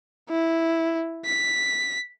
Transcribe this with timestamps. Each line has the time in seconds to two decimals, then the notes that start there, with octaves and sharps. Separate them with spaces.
0.30 E4
1.25 B6